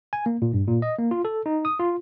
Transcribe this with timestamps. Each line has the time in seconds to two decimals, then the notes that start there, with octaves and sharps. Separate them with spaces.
0.13 G#5
0.26 A#3
0.42 A#2
0.53 G2
0.68 A#2
0.82 D#5
0.98 A#3
1.11 F4
1.25 A4
1.46 D#4
1.65 D#6
1.79 F4